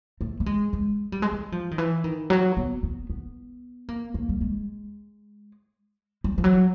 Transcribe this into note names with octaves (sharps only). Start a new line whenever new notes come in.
A3
A3
G#3
G#3
G3
G#3
G3
F3
D#3
E3
D#3
F#3
B3
B3
B3
A#3
A#3
G3
G#3
G3
F3
F#3